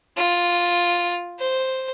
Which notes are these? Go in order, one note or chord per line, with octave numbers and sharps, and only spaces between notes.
F4
C5